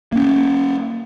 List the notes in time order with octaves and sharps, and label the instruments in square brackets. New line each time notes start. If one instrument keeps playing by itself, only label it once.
[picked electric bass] A#3 C#4